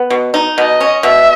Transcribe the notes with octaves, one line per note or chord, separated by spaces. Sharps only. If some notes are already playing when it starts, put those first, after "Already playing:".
Already playing: B3
B2
D#4
B2 D#5
C#4
B2 E5